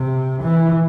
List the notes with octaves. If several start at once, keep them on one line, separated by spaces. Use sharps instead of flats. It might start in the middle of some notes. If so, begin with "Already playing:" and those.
Already playing: C3
E3